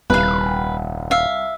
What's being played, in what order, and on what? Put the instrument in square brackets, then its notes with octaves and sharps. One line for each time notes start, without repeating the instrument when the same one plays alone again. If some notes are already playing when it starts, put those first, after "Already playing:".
[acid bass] D#1 [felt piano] C2 [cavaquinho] B4 F5
[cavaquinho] E5 F5